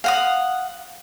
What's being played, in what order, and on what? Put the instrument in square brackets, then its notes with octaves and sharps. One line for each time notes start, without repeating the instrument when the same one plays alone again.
[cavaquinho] F5 F#5 D#6